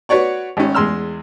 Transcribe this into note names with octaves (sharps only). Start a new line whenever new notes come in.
F#4 B4 C#5 D5 C#6
G#1 C#4
E2 G#3 C6 E6 F6